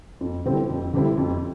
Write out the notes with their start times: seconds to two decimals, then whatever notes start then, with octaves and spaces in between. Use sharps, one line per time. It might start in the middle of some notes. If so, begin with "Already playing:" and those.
0.21 F2
0.46 D3 G3 C4 E4
0.69 F2
0.93 D3 G3 C4 E4
1.17 F2